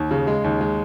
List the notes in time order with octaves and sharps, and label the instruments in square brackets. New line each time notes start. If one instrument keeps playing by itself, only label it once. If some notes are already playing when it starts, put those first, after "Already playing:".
Already playing: [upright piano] D#2
C#3
G#3
D#2
G#3